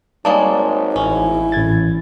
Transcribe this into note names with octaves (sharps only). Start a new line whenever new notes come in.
G#1 G3 G#3 A#3 C#5 A5
A1 C#4 E4
A1 G#6 A6